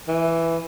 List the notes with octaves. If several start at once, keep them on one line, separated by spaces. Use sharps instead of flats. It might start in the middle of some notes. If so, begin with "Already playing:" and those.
E3